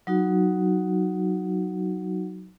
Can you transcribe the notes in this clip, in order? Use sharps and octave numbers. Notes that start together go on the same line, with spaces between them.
F#3 D#4 F#4